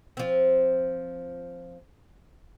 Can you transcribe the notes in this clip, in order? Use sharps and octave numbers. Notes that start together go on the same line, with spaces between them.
F3 C4